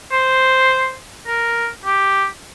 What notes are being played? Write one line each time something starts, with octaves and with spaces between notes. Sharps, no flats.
C5
A#4
G4